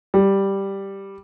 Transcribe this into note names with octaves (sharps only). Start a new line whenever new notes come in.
G3